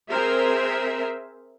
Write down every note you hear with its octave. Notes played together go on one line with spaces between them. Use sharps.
C4 G#4 A#4 C5 E5